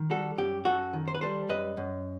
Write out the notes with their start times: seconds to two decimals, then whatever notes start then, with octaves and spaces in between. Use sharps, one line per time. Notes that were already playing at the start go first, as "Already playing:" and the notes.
Already playing: D#3
0.10 G3 F#4 A4
0.38 F#2 G4
0.65 F#2 F#4 A4
0.93 D#3
1.08 C5
1.15 B4
1.21 G3 A4 C5
1.49 F#2 B4 D#5
1.77 F#2